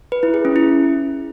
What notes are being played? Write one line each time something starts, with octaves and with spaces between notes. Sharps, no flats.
B4
E4
G#4
C#4
E4